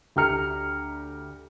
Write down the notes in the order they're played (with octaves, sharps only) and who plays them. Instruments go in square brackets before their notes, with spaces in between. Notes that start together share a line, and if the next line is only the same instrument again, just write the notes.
[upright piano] D2 G4 A#5 F6 C#7